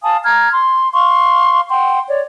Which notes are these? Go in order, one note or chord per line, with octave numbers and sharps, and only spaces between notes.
F5 G#5 A5 D#6
A#5 F6 G#6
C6
F5 C6 C#6
F#5 G5 C6
C#5 D5